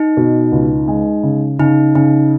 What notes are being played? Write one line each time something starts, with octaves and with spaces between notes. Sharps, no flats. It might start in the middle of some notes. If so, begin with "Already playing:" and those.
Already playing: D#4
B2
C#2
G#3
C#3
C#3 D#4
C#3 D#4